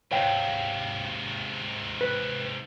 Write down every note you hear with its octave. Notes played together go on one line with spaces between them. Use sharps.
G#2 C3 C#5 F5 G5
B4